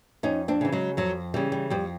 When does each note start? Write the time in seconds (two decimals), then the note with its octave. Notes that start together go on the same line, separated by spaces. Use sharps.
0.23 F2 C#4 D#4
0.48 C4 D4
0.61 C#3 E3
0.72 F#3 G#3
0.97 F2 F#3
1.34 C#3 E3 G3
1.52 G3
1.70 F2 G3